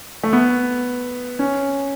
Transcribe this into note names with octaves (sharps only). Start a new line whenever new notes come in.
A3
B3
C#4